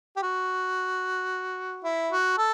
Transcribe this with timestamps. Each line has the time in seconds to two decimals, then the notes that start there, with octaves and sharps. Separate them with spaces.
0.17 G4
0.23 F#4
1.84 E4
2.11 F#4
2.38 A4